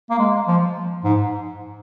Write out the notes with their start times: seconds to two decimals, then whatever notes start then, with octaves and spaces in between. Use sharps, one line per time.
0.10 A#3
0.19 G#3
0.48 F3
1.04 G#2